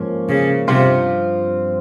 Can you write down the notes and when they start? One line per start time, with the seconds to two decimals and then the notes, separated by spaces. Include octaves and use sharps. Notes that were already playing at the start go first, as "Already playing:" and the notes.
Already playing: G#2 F3 A#3 C#4
0.29 C#3
0.68 G2 C3 F3 C4 F4